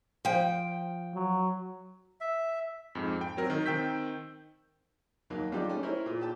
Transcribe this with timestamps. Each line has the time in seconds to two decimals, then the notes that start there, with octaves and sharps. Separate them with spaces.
0.25 F3 G5
1.14 F#3
2.21 E5
2.95 F2 G#2
3.21 G5
3.37 F#3 C4 A#4
3.50 D#3
3.66 D#3 C4 G5 E6 G6 B6
5.30 D#2 F#3 A#3
5.52 F#3 G3 D4 D#4 F4 G4
5.68 A3 C#4
5.83 E4 A#4 C5 C#5
6.06 A#2
6.21 G4 G5 A5